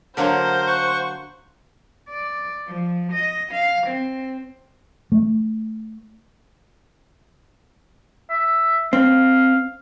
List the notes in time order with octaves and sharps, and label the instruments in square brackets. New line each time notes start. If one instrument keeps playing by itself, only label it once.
[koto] D3 F#3 A#3 [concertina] A#4 [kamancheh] C5
[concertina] F#5 C#6
[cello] D5
F3
D#5
F5
C4
[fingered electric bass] A3
[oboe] E5
[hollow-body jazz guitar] C4 [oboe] F5